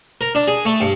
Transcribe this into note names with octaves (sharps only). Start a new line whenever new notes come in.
A#4
D4
G#4
A3
G2